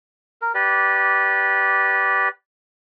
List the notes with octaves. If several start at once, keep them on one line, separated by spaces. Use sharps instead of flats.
A#4
G4 B4 D5